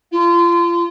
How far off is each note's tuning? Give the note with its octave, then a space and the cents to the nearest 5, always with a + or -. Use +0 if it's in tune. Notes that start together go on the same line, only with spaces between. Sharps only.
F4 -30